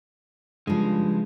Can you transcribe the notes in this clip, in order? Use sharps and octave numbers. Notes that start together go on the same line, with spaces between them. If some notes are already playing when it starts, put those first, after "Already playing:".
G2 C#3 F3 G#3